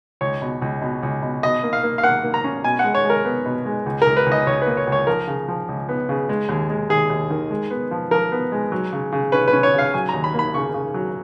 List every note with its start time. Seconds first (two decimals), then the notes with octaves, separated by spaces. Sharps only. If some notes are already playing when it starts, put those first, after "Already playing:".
0.21 C#2 C#5
0.42 B2
0.62 C#2
0.82 B2
1.03 C#2
1.22 B2
1.43 B2 D#5
1.63 A#3
1.73 F5
1.83 A#3
1.98 F5
2.03 A#3 F#5
2.24 A#3
2.34 A#5
2.44 C#4
2.64 B2 G#5
2.79 G#3 F#5
2.95 C#5
3.04 G#3
3.10 A#4
3.25 B3
3.45 B2
3.66 G#3
3.86 C#2
4.02 C#2 A#4
4.17 B4
4.26 C#2
4.32 D#5
4.47 C#2 C#5
4.62 A#3 B4
4.77 C#5
4.87 C#2
4.92 C#5
5.07 F3 A#4
5.27 C#3
5.48 F3
5.68 C#2
5.89 B3
6.09 C#3
6.29 G#3
6.49 D#2
6.70 G#3
6.89 D#2 G#4
7.10 D#2
7.30 D#3
7.51 G#3
7.71 B3
7.91 F3
8.11 F3 A#4
8.32 B3
8.52 G#3
8.72 F#3
8.93 C#3
9.12 C#3
9.32 C#4 B4
9.48 B4
9.53 C#4
9.63 C#5
9.74 C#3 F5
9.94 F#3 G#5
10.09 A#5
10.14 D#2
10.24 B5
10.34 A#3 B5
10.54 C#3 C#6
10.74 C#3
10.94 F#3